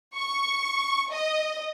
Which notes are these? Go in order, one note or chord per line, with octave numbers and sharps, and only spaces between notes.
C#6
D#5